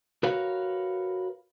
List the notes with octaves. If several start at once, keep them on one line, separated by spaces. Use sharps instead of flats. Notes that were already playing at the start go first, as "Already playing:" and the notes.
F#4 A#4 B4 C#5 F5